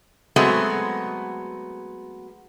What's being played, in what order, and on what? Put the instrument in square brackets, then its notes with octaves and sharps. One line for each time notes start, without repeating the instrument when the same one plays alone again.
[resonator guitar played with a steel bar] F#3 G#3 A3 B3 C4 F#4